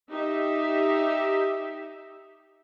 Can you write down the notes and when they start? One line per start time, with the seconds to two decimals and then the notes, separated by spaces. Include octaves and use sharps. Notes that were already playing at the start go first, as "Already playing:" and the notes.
0.11 D#4 G4 E5